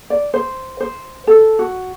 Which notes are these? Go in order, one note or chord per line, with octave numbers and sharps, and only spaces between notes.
D5
C5
C5
A4
F#4